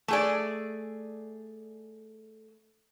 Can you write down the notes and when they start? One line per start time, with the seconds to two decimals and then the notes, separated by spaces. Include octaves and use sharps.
0.08 A3 G#4 D5